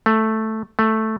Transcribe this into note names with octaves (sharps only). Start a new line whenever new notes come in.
A3
A3